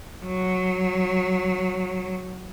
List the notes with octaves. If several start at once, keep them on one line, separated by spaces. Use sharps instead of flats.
F#3